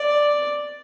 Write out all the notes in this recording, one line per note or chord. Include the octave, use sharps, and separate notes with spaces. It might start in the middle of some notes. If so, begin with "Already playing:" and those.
Already playing: D5